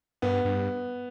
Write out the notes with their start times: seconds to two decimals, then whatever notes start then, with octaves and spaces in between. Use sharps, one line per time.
0.22 G2 B3
0.45 G2